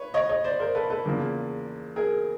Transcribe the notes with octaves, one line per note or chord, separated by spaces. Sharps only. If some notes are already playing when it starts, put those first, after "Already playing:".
Already playing: B4 C#5
C#5 D#5
C#5 D#5
C5 D5
A#4 C5
A4 B4
A4 B4
E2 C#3 F3 A#3
G#4 A#4